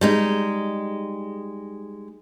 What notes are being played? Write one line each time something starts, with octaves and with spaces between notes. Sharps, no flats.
G3 G#3 D#4